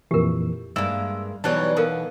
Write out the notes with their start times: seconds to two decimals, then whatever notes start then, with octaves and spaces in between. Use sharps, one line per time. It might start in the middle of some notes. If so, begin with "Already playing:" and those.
0.11 F2 A#2 E3 G4 A#4
0.76 G2 G#3 A#3 E5 E6
1.44 B2 E3 F#3 G3 D#4 C#5 A5 F#6
1.77 B3 A4 A#4 F5